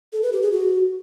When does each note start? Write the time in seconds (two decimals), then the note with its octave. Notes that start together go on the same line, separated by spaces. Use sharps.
0.13 A4
0.23 B4
0.32 G4
0.42 G#4
0.52 F#4